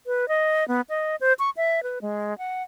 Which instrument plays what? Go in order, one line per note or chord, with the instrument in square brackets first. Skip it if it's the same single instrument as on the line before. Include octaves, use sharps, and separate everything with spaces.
[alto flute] B4
D#5
B3
D#5
C5
C#6
E5
B4
G#3
F#5